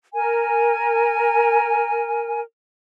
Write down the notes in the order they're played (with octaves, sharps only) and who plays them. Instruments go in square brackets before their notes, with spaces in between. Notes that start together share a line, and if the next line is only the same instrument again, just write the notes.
[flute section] A#4 G#5